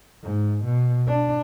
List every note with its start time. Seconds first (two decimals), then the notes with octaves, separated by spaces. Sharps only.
0.23 G#2
0.65 B2
1.08 D4